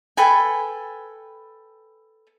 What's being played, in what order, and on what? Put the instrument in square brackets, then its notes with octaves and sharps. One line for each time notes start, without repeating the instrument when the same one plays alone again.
[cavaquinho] A4 B4 G5 G#5